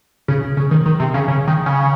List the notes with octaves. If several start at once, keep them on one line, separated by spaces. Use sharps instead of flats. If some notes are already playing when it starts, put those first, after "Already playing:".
C#3
C#3
D#3
D#3
C3
C#3
C#3
D#3
C#3